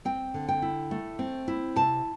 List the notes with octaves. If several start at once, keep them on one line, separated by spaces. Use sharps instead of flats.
C4 G5
D3
G5
E4
A3
C4
E4
C3 A5